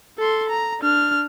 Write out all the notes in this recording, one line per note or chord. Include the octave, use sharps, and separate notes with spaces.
A4 C6
A#5
D4 F6